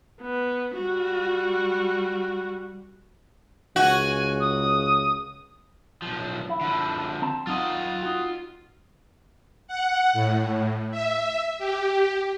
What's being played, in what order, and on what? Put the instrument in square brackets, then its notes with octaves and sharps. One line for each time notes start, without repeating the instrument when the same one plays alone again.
[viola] B3
G3 F#4
[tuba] C#2 [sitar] F#4 [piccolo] G#5
[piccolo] D#6
[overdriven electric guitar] B1 F3
[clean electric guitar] E4
[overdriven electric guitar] D3 F3
[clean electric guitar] C4 A5
[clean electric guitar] F#3 D#4 [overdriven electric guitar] F4 D#5
[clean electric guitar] D#4 F#4
[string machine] F#5
A2
E5
G4